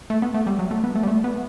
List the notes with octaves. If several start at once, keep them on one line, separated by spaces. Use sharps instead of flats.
A3
B3
A3
G3
F#3
A3
B3
A3
G3
A3
B3